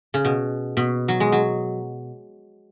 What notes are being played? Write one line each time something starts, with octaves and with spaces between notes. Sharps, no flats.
C#3
B2
B2
F#3
G#3
F#3